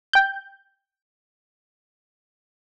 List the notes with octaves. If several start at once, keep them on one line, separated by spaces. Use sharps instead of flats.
G5 G6